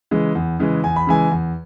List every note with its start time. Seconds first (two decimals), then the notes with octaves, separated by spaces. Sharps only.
0.11 C#3 E3 G#3
0.35 E2
0.59 C#3 E3 G#3
0.84 E2 G#5
0.96 B5
1.07 C#3 E3 G#3 G#5
1.31 E2